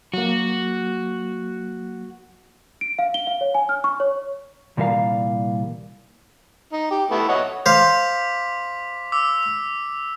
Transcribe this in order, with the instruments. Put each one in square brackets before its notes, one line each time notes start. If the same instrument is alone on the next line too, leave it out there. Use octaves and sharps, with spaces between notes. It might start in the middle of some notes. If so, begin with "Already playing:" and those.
[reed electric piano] F#3 A#3 [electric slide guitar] F#4
[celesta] D7
F5
G7
F5
C#5
G#5
F6
C#6
C#5
[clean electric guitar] C2 A#2 E3 G3 A#4 F5
[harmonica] D#4
G4
A3 B3 E4
C#5 D#5 F#5
[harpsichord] C5 F5 [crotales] D6 B6
[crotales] D6 E6